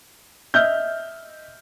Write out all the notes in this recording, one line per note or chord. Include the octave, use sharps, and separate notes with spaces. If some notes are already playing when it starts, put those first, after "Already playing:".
D#5 E5 F6 G6